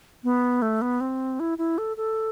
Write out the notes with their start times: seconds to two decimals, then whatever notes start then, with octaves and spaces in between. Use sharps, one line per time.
0.24 B3
0.62 A3
0.82 B3
1.01 C4
1.40 E4
1.58 E4
1.78 A4
1.97 A4